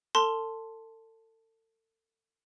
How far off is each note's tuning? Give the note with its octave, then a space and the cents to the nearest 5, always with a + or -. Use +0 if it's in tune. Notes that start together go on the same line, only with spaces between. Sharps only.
A4 +35 A5 +0 C6 +0